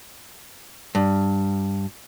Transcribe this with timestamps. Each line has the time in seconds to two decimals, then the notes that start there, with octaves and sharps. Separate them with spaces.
0.95 G2